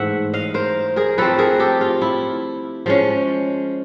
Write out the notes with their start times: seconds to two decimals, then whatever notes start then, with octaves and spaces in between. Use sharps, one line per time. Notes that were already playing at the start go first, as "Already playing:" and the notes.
Already playing: G#2 E3 A3 C5 E5 F#5
0.33 D#5 F5
0.54 A#4 C5
0.96 G#4 A#4
1.18 F3 A3 C4 A4 B4
1.39 G#4 A#4
1.60 G4 A4
1.81 F4
2.02 E4
2.86 F3 G#3 C#4